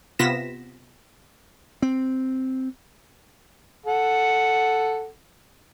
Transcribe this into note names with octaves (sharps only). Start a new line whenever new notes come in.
C3 B3 F4 A#6 B6 E7
C4
A4 F#5